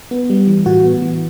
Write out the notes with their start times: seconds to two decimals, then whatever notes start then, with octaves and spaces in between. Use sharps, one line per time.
0.11 B3
0.30 G3
0.48 E3
0.66 A2 F#4
0.84 B3
1.02 E3